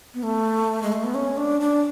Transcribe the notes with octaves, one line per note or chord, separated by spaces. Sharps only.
B3
A3
G#3
A3
B3
C#4
D4
D4